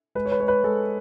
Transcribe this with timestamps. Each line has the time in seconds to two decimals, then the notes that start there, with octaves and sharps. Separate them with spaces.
0.15 G#3 B4
0.25 C#5
0.32 B4
0.39 G#3 C#5
0.48 B4
0.64 G#3 A4